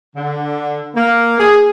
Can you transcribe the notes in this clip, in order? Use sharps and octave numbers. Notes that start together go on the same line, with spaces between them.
D3
A#3
G#4